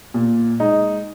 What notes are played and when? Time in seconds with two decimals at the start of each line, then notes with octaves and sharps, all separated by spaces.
0.14 A#2
0.60 G#3 D#4